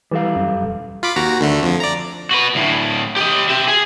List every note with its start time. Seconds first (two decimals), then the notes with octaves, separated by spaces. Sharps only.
0.12 E3 G3 A4 F5
0.36 F#2
0.63 E1
1.03 F4 B5 D6
1.16 D#2 F#4 A#5
1.40 D2 D3 A3
1.63 F2 F3
1.80 D5 A#5
2.31 F#4 B4
2.55 D2 A2
3.16 G4 D#5
3.49 G4 E5
3.68 G#4